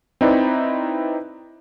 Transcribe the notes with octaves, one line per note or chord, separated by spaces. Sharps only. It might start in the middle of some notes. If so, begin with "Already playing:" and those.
C4 D#4 E4 B4 D5